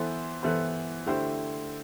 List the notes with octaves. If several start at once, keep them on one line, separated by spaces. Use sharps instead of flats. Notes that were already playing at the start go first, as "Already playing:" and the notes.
Already playing: E3 B3 E4 A4 C5
E3 B3 E4 A4 C5
D3 A3 E4 G4 C5